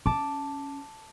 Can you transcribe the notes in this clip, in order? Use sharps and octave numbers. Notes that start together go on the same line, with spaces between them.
C#4 A5 D6